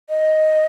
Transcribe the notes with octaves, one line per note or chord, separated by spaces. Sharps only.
D#5